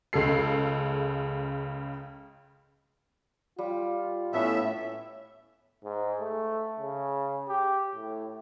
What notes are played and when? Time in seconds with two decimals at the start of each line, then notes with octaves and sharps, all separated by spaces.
0.13 C#2 C#3 G#4 A4 C7
3.59 G3 F4
4.33 A2 B3 C#4 A4 E5
5.84 G#2
6.20 A3
6.80 C#3
7.49 G4
7.96 A2